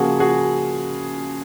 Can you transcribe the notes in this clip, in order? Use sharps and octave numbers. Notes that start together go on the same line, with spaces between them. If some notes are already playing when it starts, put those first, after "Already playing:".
Already playing: C#3 F3 A#3 F#4 G#4
F#4 G#4